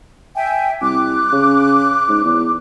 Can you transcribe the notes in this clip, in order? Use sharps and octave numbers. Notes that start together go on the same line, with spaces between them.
E5 G5 G#5
C2 D6 F#6
C#3
G#2
E2